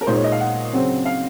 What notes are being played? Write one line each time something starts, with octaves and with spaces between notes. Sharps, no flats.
A#4
A#2 G#3 D#4 C5
C#5
D#5
F5
F#5
C#3 F#3 C4
F5